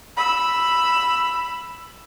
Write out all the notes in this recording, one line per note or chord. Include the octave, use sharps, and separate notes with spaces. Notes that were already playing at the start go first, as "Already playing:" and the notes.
B5 E6